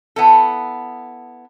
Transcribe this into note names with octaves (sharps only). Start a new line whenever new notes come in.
B3 E4 A4